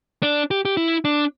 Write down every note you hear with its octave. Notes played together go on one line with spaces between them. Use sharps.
D4
G4
G4
E4
D4